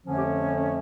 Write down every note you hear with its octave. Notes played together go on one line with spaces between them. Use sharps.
F2 D3 F3 A3 C#4
G4